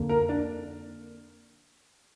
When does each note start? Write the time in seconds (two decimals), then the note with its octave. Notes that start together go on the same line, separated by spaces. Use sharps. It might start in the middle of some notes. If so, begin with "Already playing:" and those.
Already playing: F2 D3 A#3
0.09 A#4
0.29 D4